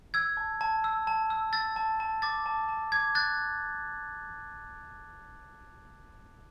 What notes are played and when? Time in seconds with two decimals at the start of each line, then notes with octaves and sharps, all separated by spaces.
0.14 E6 G#6
0.37 A5
0.61 A5
0.84 E6
1.07 A5
1.30 E6
1.53 E6 A6
1.76 A5
2.00 A5
2.22 D6 A6
2.46 A5
2.69 A5
2.92 D6 G#6
3.15 F#6 A6